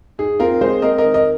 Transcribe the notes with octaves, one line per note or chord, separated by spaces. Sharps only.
G#2 G#4
C4 F4 A#4
G#3 G#4 C5
C4 A#4 D#5
A#4 D#5
D#3
A#4 D#5